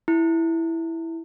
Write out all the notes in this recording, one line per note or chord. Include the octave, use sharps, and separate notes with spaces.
E4